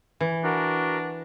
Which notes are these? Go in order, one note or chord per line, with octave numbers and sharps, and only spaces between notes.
E3
D4 F#4 A#4